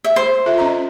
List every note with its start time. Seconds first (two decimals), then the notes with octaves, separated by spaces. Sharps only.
0.04 E5
0.16 C5
0.46 F4 A4 E5
0.58 C#4 D#5 A#5